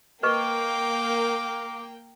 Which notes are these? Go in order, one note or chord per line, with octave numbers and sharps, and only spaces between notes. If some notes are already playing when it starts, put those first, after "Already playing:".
A#3 A#4 B4 D#5 F5 G5 C#6 D6